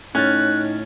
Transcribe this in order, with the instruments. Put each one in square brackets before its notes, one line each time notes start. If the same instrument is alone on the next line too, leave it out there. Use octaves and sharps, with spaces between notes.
[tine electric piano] A2 F6 A6 [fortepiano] C#4 [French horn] D#4 [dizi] F#6